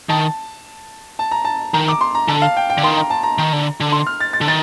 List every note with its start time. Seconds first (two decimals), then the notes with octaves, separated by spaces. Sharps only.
0.09 D#3 A5
1.19 A5
1.31 A#5
1.45 A5
1.73 D#3 A#5
1.88 D6
2.01 C6
2.15 A#5
2.28 D3 A5
2.42 F5
2.57 G5
2.70 G5
2.78 D3
2.83 D#3 C6
2.97 A#5
3.10 A5
3.23 A#5
3.38 D#3
3.53 D3
3.80 D3
3.92 C6
4.07 F6
4.20 A6
4.33 A6
4.41 D3
4.48 D#3 A6